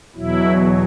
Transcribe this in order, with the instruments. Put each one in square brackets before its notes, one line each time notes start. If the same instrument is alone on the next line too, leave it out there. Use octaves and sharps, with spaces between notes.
[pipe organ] E2 B2 F#3 E4